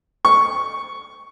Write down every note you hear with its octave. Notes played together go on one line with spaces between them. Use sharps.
C#6